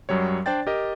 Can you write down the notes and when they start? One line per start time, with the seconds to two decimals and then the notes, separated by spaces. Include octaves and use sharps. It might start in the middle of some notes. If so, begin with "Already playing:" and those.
0.09 F#2 F#3 G3 C#5
0.46 D4 C5 D5 G5 A6
0.67 G4 A#4 D#5